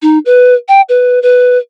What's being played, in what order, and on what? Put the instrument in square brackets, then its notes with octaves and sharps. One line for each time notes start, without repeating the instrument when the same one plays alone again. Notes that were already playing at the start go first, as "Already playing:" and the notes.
[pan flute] D#4
B4
G5
B4
B4